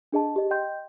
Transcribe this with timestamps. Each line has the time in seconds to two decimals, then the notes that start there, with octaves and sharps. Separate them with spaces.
0.12 D4 G#4 D#5 A5
0.36 G4 D#5
0.51 D#5 G5 C6 G6